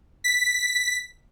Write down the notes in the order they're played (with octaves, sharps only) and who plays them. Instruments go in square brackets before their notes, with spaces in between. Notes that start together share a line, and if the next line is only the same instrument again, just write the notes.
[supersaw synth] B6